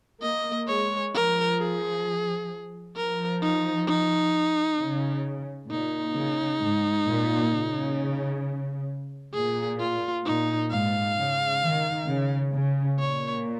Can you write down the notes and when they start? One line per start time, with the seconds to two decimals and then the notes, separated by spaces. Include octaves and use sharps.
0.22 A#3 D#5
0.67 G#3 C#5
1.14 F3 A#4
1.59 G#4
2.96 F3 A#4
3.42 D#4
3.87 D#4
4.79 C#3
5.69 A#2 D#4
6.15 C#3
6.61 G#2
7.07 A#2
7.52 C#3
9.34 A#2 G#4
9.80 F4
10.25 A#2 D#4
10.71 G#2 F5
11.17 C#3
11.63 D#3
12.08 C#3
12.54 C#3
12.99 A#2 C#5